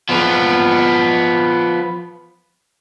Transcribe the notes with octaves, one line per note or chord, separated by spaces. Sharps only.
F3 B3